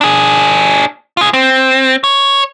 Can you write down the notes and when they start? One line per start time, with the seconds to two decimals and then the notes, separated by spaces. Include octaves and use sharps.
0.01 D4 G#4
1.17 F4 G#4
1.33 C4
2.04 C#5